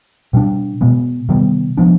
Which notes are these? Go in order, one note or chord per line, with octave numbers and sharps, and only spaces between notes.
B2 G3 D4
B2 G#3 B3
C3 D#3 G3 B3
F3 G#3 B3 D4